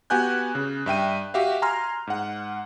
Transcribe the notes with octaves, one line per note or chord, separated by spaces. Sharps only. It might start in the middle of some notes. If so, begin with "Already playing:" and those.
B3 F#4 G4 G#5 F#6 G6
C#3
G2 E5 G5 D#7
F#4 G4 E5 F5
G#5 A#5 C6 F6
G#2 F#5